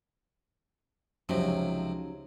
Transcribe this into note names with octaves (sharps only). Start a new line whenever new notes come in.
C#2 C3 F3 F#3 C#4 D#4